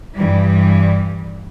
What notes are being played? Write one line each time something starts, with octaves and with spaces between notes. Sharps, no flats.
G2 E3 G3